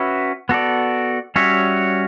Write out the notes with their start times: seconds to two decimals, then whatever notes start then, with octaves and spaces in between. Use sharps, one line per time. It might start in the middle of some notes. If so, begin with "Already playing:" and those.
Already playing: C#4 F#4 B4 E5
0.49 B3 F#4 A4 D5
1.36 G3 C#4 F#4 C#5 E5